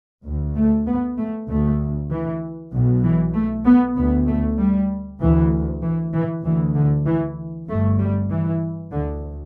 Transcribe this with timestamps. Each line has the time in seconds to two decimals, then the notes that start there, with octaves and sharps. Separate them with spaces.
0.25 D2
0.56 A3
0.87 B3
1.18 A3
1.48 D2 A3
2.10 E3
2.72 B1 B2
3.03 E3
3.34 A3
3.65 B3
3.96 D2 B3
4.28 A3
4.58 G3
5.21 D2 E3
5.82 E3
6.13 E3
6.44 D2 E3
6.75 D3
7.06 E3
7.68 G1 G2 A3
7.99 G3
8.30 E3
8.92 D2 D3